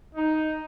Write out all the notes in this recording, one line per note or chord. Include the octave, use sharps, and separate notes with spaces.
D#4